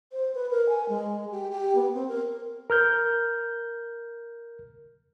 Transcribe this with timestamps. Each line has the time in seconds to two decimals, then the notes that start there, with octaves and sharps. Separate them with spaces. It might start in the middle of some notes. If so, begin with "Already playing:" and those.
0.12 C5
0.35 B4
0.51 A#4
0.69 G#5
0.89 G#3
1.31 G4
1.51 G4
1.75 B3
1.94 C4
2.08 A#4
2.70 A#4 F6 G6